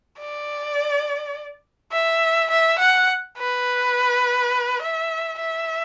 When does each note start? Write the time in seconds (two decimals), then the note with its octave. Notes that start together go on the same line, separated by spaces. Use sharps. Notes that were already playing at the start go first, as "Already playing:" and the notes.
0.19 D5
1.92 E5
2.50 E5
2.79 F#5
3.38 B4
4.82 E5
5.39 E5